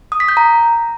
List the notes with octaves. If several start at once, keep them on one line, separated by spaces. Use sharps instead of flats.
D#6
B6
G6
A#5